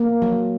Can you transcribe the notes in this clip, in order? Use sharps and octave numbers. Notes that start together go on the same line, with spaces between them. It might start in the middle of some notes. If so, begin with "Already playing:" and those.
Already playing: A#3
F#3